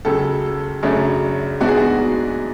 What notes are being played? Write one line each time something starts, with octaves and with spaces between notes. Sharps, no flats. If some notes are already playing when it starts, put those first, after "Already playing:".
C#2 C#3 F#3 A4
F#2 C#3 F#3 A3 D4
G#2 G#3 B3 D4 F#4
G#4
F#4